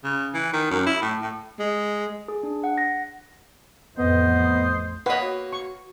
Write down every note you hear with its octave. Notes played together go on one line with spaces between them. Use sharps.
C#3
E3
D#3
F#2
E4
A2
A2
G#3
G#4
D4
F#5
A#6
A1 F2 B3 C5 D#5
A#3 B4 C#5 D#5 F#5
F#4
C#6